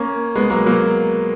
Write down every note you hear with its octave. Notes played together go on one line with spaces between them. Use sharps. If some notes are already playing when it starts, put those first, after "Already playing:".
Already playing: A#3 C#4
G#3 B3
F#3 A#3
F#3 A#3